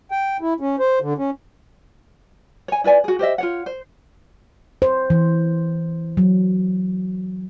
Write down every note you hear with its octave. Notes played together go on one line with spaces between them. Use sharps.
G5
E4
C#4
C5
D3
C#4
C#5 G#5
E4 B4 D5 G#5
F#4 G#4
G4 C5 D#5 E5
F4 C#5 F#5
C5
C5
E3
F#3